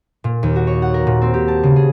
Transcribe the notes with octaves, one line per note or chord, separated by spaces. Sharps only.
A#2
D#2
F#4
C#5
F#5
A#4
A#2
C4
G4
A5
C#3
G#4